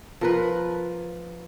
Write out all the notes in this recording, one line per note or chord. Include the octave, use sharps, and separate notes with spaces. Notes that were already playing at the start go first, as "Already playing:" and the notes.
F3 A#4 B4